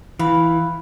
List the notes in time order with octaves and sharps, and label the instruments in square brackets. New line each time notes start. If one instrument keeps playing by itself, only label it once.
[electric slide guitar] E3 [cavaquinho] F5 B5